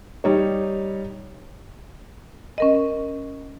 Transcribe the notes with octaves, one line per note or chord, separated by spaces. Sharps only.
G3 D#4 C#5
C#4 A#4 D#5